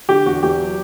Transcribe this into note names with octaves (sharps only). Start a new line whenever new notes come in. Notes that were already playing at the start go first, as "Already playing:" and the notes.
D3 G4
E2 F#4
E2 G4
F#3